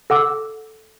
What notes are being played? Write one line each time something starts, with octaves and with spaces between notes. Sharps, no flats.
A4 F#5 D6 E6